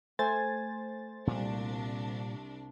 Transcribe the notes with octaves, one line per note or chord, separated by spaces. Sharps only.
A3 C5 G#5 A6
C2 A#2 G3 D4